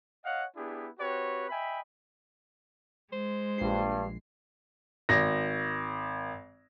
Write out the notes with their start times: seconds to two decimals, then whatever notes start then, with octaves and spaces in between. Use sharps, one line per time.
0.25 C#5 D#5 F5 F#5
0.56 B3 D4 E4 G4 G#4
0.99 C4 F#4 G4 B4 C#5
1.50 D#5 E5 G5 G#5 B5
3.13 G#3 C5
3.58 A#1 G2 C7
5.09 G#1 A#6